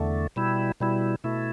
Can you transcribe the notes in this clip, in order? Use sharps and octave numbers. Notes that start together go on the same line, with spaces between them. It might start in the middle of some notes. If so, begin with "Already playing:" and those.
Already playing: E2 D3 A3
B2 G3 E4
B2 G3 E4
B2 A3 E4